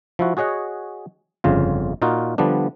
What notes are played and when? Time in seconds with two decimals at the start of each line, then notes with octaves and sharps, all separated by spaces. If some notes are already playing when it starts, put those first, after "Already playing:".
0.19 F3 E4 F#4
0.37 F#4 G#4 C#5 D#5 F#5
1.44 G1 F2 C#3 F4
2.02 A#2 D#4 F4 F#4
2.38 D3 F3 G3 B3 D4